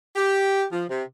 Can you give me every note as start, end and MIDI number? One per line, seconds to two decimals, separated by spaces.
0.16 0.63 67
0.71 0.85 53
0.89 1.03 48